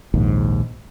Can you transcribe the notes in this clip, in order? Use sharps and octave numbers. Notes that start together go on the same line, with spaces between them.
A#1 D#2 G#2